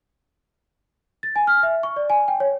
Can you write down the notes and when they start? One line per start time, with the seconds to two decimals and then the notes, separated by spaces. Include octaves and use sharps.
1.23 A6
1.36 G#5
1.47 F6
1.63 E5
1.83 C#6
1.96 D5
2.10 G#5
2.28 G5
2.40 C#5